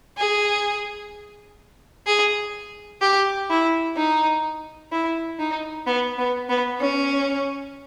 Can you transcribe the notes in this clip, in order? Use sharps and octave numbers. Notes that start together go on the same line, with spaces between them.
G#4
G#4
G4
E4
D#4
E4
D#4
B3
B3
B3
C#4